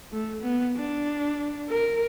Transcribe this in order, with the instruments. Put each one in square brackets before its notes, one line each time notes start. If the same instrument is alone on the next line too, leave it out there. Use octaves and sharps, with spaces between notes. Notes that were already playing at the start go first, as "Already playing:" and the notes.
[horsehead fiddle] A3
B3
D4
A#4